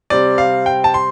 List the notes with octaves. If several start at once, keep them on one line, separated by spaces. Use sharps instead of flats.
C3 G3 C4 D5
F5
G5
A5
C6